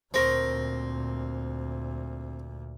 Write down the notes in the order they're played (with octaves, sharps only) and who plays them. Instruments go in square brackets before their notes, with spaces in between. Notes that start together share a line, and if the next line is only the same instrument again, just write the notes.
[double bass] D2 A#2 [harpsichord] C4 [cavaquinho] A#4 C#6 D#6